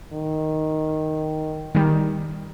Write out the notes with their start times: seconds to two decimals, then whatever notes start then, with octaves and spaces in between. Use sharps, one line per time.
0.13 D#3
1.75 D#3 G3